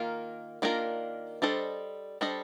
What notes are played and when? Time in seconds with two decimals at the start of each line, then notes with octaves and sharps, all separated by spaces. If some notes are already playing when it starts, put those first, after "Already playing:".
Already playing: D#3 A#3 F4 A#4
0.62 D#3 A#3 D4 F4 A#4
1.42 G3 D4 A4 C5 D#5
2.21 G3 D4 A4 C5 D#5